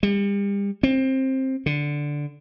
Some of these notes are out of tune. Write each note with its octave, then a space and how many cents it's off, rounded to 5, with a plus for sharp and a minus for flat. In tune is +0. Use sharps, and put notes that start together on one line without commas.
G3 +40
C4 +15
D3 -5